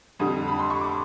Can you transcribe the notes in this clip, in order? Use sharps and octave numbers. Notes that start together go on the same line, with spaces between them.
F2 D3 G3 D#6
B5
C6
C#6
D6